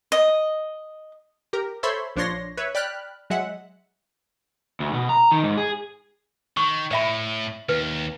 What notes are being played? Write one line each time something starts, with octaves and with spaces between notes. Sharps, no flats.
D#5
G4 A#4
A4 C5 C#5 E5 B5 C6
A#1 F3 D4 C#5 C6 A#6
B4 C#5 E5
D5 G5 B5 F6 F#6
F#3 G#3 E5 F#5
D2
B2
A#5
D#3
G#2
G#4
D#3 C#6
A2 D5 E5 B5
D#2 B4